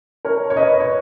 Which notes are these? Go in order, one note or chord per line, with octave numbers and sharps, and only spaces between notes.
A#4 C#5
C#5
B4 D#5
C#5